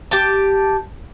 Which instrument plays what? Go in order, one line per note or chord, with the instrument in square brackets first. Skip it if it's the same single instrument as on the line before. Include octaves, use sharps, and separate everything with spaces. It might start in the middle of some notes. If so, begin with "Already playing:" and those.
[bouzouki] G4 A5